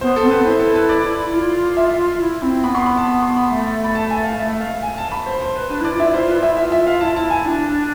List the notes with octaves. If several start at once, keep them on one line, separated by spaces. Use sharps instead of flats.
B3 C5
A4
C4
B3 B4
C4
E4 C5
A4
B4
D5
F4
E5
E4
C4
B3 B5
C6
B5
A5
C6
B5
A3
B5
A5
G#5
F5
A3 E5
F5
G#5
A5
B5
C5
C5
B4
D4 B4
E4 D5
F4
E4 E5
F4 C5
B4
E4
E5
F4 E5
E5
F5
E4 A5
F4
E4 A5
G#5
D4